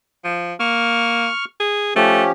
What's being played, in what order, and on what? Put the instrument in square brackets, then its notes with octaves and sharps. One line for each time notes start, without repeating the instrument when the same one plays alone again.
[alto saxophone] F3
[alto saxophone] A#3 [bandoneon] C#6 F6
[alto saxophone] G#4
[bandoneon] F3 C#4 G4 [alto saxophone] A3